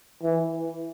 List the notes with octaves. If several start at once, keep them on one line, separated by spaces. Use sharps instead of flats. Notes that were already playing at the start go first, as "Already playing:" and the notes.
E3